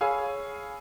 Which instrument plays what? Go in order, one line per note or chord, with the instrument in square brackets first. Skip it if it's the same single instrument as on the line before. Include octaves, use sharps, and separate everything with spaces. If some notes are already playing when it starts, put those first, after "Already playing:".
[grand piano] G#4 C#5 F5 G#5 B5 E6